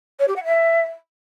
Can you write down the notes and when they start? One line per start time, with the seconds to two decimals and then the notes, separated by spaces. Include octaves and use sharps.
0.19 C#5
0.28 G4
0.36 F#5
0.44 E5